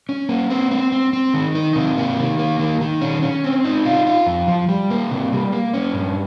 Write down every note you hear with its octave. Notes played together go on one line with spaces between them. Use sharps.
C#4
A#3
C4
C4
C4
C4
D#3
D#4
C3
A#3
D#3
A#3
D#3
D#3
C#4
C#4
C4
D#4
F4
F4
F2
F3
G3
A#3
C3
G3
A#3
C#4
G2